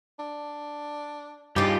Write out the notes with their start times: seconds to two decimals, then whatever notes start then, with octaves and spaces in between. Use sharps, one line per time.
0.19 D4
1.56 G2 C#3 G3 D#4 F4 G4